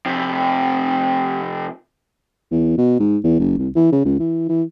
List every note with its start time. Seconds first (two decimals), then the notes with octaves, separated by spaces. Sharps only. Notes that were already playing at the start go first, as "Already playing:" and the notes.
0.06 F2 C3
2.51 E2
2.78 B2
3.00 G#2
3.24 E2
3.40 F#1
3.58 C2
3.75 E3
3.92 C#3
4.05 C#2
4.19 E3
4.49 E3